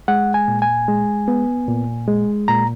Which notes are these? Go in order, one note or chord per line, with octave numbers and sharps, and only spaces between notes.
G#3 F#5
G#5
A#2
G#5
G#3
B3
A#2
G#3
A#2 A#5